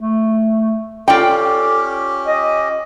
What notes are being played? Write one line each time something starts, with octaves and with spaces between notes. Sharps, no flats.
A3
C#4 F4 G4 A4 D5 G5
D#5